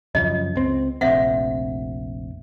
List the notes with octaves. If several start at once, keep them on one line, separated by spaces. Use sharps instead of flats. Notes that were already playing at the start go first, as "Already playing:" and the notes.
F#2 C#3 F3 D#5
C#2 C4
F1 A#1 C4 E5 F#5